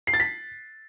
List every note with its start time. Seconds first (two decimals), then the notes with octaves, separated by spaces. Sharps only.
0.07 C7
0.13 A6
0.20 B6